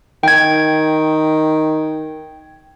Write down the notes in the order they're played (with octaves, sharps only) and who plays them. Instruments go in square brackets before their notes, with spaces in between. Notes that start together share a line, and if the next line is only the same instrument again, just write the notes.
[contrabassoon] D#3 [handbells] G5 G#6